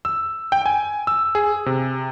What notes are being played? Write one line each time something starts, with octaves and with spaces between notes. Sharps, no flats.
E6
G5
G#5
E6
G#4
C3